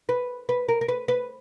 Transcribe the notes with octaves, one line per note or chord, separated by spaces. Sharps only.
B4
B4
A#4
A#4
B4
B4